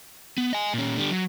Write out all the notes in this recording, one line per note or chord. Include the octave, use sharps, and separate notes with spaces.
B3
D#5 G#5
A#2 C#4
D3 G3
F#3